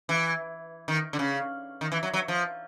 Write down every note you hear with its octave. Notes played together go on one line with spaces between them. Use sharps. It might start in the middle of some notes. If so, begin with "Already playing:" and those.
E3
D#3
D3
C#3
D#3
E3
F#3
F#3
F3